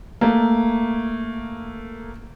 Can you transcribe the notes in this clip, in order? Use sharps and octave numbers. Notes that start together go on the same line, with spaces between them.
A3 A#3